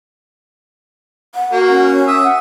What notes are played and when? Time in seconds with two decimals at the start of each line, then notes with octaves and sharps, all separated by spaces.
1.35 F#5
1.52 A#3 F#4
1.69 C#4
2.07 E5 D#6 E6
2.24 F#5